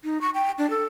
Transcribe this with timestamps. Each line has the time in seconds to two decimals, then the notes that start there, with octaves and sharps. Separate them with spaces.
0.04 D#4
0.21 C#6
0.35 G5
0.58 D4
0.70 A4